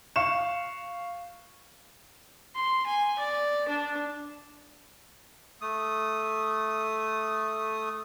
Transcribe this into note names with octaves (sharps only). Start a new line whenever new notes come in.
F5 C#6 E7
C6
G#5
D5
D4
A3 D#6